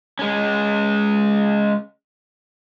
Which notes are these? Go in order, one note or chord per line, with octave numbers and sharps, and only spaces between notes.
G#3 C#4